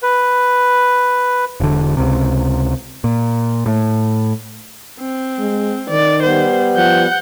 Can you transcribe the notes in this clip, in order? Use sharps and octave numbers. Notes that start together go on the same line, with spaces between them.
B4
E1 D3
C#2 C3
A#2
A2
C4
G#3
D#3 D5
G3 B3 C5
F3 F#5 G6